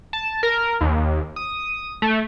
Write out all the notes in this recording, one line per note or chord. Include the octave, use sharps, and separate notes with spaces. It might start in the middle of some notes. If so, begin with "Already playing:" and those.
A5
A#4
D#2
D#6
A3